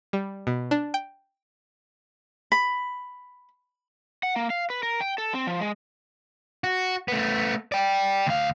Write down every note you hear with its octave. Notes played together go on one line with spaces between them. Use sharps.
G3
B2
D4
G5
B5
F#5
A#3
F5
B4
A#4
G5
A4
C4
F3
G#3
F#4
A3 B3
D5 G5
D2 F5